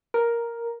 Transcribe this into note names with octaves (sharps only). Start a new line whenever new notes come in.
A#4